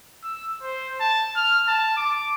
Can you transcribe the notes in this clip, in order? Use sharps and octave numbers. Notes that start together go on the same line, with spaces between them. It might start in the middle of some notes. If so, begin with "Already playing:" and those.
E6
C5
A5
F6
A5
D6